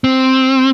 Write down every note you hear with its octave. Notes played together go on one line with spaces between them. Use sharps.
C4